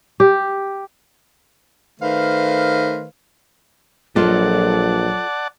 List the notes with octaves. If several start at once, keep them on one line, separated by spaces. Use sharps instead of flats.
G4
D#3 A3 B4 C5 F5
A#1 F#3 F4 A4 D5 D#5 F#5 A5